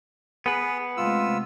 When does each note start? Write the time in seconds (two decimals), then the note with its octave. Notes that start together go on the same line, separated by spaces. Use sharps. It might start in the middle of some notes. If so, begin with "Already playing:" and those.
0.46 B3 G#4 B4
0.97 C3 G#3 A3 F4 E6